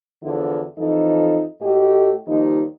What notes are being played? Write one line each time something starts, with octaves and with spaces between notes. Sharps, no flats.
E2 D3 F3 E4 F#4
F2 E3 F3 D#4 A4
A2 A3 F#4 G4 D#5
D#2 F3 G3 D#4